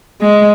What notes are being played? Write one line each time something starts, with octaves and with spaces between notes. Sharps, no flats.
G#3